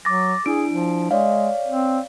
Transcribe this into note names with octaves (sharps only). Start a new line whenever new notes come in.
F#3 D6 A6 A#6
D4 E4 G#4 D7
F3
G#3 C#5 D5 F5
C4